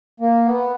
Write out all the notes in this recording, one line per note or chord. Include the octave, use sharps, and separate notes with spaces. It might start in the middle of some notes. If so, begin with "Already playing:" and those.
A#3
B3